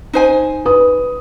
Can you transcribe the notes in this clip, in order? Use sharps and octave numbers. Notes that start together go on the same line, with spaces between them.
D#4 C5 G#5
B4 D#6